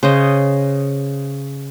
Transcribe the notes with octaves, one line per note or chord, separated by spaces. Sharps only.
C#3 C5 D#5